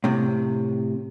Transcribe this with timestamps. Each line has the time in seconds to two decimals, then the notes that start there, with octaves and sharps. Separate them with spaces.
0.04 A2 C3